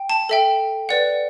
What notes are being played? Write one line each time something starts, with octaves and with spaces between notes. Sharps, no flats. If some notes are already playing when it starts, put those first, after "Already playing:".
Already playing: G5
A5
A4 E5 G5
B4 D5 F#5